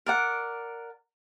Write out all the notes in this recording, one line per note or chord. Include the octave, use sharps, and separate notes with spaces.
A#4 D5 F#5